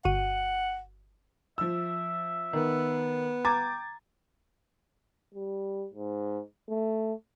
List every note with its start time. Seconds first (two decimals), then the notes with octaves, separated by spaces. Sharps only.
0.05 G1 F#4 F#5 D#7
1.58 F3 E5 E6
2.53 D#3 B3
3.45 G5 A#5 D6 G#6 A6
5.34 G3
5.93 G#2
6.69 A3